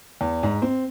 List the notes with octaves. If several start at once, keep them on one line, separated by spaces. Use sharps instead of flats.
E2
G#2
C4